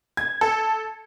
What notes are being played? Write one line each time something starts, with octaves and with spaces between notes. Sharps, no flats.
G#6
A4